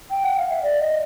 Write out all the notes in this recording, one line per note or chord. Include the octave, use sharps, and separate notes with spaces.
G5
F#5
F5
E5
D5
D#5